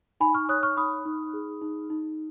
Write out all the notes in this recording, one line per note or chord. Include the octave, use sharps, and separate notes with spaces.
D#4 G#5 B5
C#6 F6
C#5 D#6 F#6
C#6 F6
D#4 B5 D#6
D#4
G#4
D#4
D#4